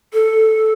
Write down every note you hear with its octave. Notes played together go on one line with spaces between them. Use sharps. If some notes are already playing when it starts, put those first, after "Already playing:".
A4